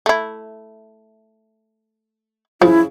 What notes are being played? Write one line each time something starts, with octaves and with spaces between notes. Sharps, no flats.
A3 E4
C#3 F3 E4